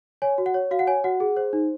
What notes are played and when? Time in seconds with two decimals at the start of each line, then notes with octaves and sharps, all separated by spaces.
0.22 C#5 G#5
0.38 F#4
0.46 F#5
0.54 C#5
0.71 F#4 F5
0.79 F#5
0.87 C#5 G#5
1.04 F#4 F#5
1.20 G#4
1.37 C5
1.53 D#4